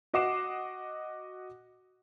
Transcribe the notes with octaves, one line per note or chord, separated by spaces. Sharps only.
F#4 D#5 F#5 D6 C7 E7